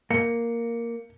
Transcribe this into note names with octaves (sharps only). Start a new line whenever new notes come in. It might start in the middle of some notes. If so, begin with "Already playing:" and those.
A#3 C#7